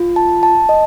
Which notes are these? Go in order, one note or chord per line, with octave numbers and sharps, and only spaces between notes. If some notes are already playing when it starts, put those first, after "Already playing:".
Already playing: F4
A5
A5
D#5